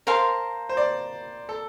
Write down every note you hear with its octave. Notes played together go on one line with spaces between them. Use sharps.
A#4 C5 F5 A5 C6
C5
D5
A4